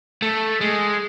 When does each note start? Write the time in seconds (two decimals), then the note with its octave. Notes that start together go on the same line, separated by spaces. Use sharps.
0.22 A3
0.61 G#3